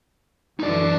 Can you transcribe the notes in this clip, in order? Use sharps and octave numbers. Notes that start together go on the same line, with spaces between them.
F#2 D3 E3 D#4 D5